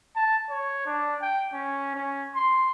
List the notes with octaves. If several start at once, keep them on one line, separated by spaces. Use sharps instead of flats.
A5
C#5
D4
G5
C#4
C#4
C6